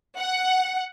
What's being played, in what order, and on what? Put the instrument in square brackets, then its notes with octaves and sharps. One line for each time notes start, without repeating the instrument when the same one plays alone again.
[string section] F#5